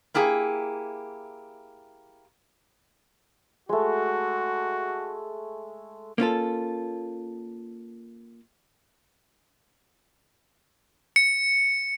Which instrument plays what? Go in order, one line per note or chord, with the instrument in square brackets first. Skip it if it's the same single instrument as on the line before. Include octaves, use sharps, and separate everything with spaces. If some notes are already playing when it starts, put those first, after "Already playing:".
[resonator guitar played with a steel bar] A#3 E4 G4 G#4
[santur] G#3 A3 [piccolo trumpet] F#4
[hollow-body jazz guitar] A#3 C#4 F4 A4
[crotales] C#7